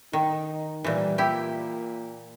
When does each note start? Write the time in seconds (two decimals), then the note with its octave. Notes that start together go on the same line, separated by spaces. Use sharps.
0.13 D#3 D#4
0.84 A#2 E3 G3
1.18 A#2 E4 G4